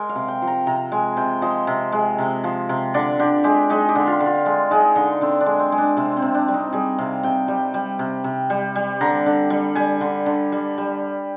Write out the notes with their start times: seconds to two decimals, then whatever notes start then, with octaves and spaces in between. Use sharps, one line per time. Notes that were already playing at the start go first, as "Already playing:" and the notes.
Already playing: G#3 A#4
0.09 F5
0.16 C3
0.28 G5
0.42 F3
0.47 A#5
0.67 C3 A#5
0.92 G#3 G#5
1.17 C3 G5
1.42 F3 D#5
1.67 C3
1.92 G#3
2.18 C3
2.44 F3
2.69 C3
2.94 D3 D5
3.19 D3 G4
3.44 G#3 G4
3.70 G#3 D#4
3.89 G4
3.95 D3
4.07 F4
4.20 D3
4.26 F4
4.46 G#3
4.71 G#3 D#4
4.96 D3 D#4
5.21 D3 C4
5.41 D4
5.46 G#3
5.59 C4
5.72 G#3
5.78 D4
5.97 C3 C4
6.17 C4
6.22 C3
6.34 D4
6.48 G3
6.54 D#4
6.73 G3 G#4
6.98 C3 F5
7.23 C3 G5
7.48 G3
7.74 G3
7.99 C3
8.24 C3
8.50 G3
8.76 G3
9.01 D3 A#5
9.26 D3
9.50 G3
9.75 G3 G#5
10.01 D3
10.26 D3
10.52 G3
10.78 G3